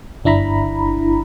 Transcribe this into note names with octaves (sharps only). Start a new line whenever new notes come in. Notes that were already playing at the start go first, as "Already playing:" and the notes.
G1 D4 E4 A#5 B5